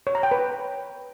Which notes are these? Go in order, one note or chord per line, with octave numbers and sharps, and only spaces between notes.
C#5
A#5
G5
B4